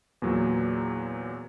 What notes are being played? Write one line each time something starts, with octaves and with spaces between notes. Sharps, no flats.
E2 A#2 F#3